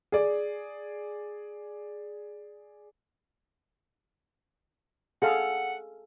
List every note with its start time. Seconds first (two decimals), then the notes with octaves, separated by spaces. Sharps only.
0.12 G#4 D5
5.22 G#4 A4 F5 F#5